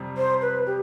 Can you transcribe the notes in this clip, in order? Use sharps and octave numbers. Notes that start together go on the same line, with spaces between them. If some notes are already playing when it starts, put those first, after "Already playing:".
Already playing: F2 C3 G3
C5
B4
G4